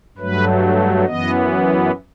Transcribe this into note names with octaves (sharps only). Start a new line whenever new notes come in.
G2 F#3 A3 B4
F#2 E3 B3 D#5